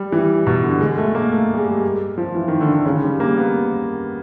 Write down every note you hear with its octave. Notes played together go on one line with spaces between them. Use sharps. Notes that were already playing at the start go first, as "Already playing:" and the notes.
Already playing: G3
E3
B2
D3
G#3
A3
A#3
A3
G3
G#3
F3
E3
D#3
D3
D3
C#3
G3
A#3
B3